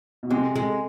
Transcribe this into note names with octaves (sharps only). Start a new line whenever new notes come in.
B2
C3 G#3
G#3